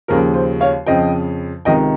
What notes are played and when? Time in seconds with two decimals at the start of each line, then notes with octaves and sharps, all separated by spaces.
0.08 D#2 C#3 F3 A#4
0.34 C5
0.61 C#5 F5
0.87 F2 C#3 F3 D#5 G5
1.65 C#2 C3 D#3 D#5 G5